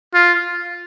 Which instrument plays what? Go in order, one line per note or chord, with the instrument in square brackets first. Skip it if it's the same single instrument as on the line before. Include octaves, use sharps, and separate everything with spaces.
[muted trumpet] F4